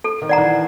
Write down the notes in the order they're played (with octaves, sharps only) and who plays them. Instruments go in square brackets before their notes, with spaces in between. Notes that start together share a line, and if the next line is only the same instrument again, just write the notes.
[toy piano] A4
[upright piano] D#3
[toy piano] D5 F#5 A#5
[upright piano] E3